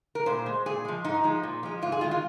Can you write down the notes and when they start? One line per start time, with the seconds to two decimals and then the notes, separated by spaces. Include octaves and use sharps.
0.15 A#4
0.26 A#2 C5
0.46 G#3
0.66 A#2 G#4
0.85 F3 G#3
1.05 G#2 D#4
1.24 F3 G#3
1.43 A#2
1.63 F3 G#3
1.82 G#2 F4
1.92 G#4
2.01 D#3 G#3 F4
2.11 F4